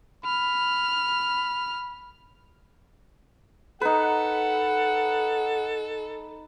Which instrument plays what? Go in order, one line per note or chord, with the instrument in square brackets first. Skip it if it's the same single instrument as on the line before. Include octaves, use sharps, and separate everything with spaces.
[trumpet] B5 [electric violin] F6
[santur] D#4 B4 [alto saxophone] A4 [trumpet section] F#5